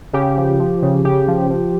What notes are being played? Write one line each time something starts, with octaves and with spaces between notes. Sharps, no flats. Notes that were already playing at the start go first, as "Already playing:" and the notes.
C#3 G4
F3
F3
C#3
C#3 G4
F3
F3